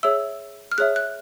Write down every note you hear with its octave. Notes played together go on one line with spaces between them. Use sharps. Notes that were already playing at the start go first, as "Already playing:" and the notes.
G#4 C#5 E5 E6
F6
G#4 C#5 E5 F#6
F#6